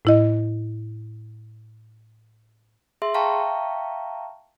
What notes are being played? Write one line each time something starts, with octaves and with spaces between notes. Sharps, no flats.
A2 E4 D#5
G#4 E5 C6
E5 F5 G5 A5 A#5 C#6